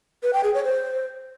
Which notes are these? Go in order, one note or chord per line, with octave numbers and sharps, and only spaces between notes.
B4
G5
G#4
C#5
C5